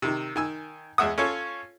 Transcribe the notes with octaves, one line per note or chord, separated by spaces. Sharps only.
C3 D#3
D#3 G#5 E6
E2 G#3 E5 F#5 D#6
C#4 F4 A4 C#5